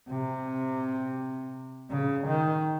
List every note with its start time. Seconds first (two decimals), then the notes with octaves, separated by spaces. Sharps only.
0.09 C3
1.90 C#3
2.27 D#3